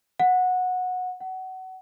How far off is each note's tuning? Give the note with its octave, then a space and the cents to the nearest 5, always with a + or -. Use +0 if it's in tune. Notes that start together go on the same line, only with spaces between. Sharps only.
F#5 -15
F#5 +25